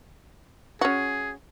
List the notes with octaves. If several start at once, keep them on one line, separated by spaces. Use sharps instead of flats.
C#4 F#4 G#4